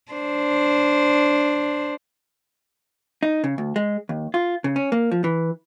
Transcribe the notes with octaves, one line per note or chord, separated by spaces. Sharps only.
D4 C5
D#4
C#3
D2
G#3
D#2
F4
C#3
C#4
A#3
F3
E3